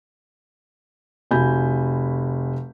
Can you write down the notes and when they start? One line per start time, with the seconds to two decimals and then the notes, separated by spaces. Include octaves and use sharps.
1.31 F1 F#4 G#5 B5 G6